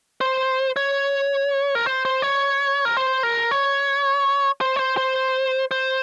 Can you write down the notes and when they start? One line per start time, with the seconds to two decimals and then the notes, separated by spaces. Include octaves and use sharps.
0.21 C5
0.76 C#5
1.75 A#4
1.86 C5
2.05 C5
2.22 C#5
2.85 A#4
2.97 C5
3.23 A#4
3.51 C#5
4.61 C5
4.76 C#5
4.79 C5
4.97 C5
5.71 C5